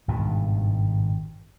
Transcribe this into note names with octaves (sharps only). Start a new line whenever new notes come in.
G#1 G2 B2 D#3